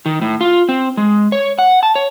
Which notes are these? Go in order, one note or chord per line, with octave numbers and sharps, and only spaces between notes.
D#3
A2
F4
C4
G#3
C#5
F#5
A5
C#5